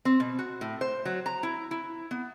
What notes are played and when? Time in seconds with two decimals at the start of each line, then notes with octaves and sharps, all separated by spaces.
0.05 C4
0.20 B2
0.39 F#4
0.61 A2
0.81 C5
1.05 F#3
1.26 A#5
1.43 E4
1.71 E4
2.11 B3